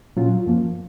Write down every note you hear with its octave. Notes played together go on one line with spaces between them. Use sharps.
A#2 F#3 C#4 F4
F#2 F3 A#3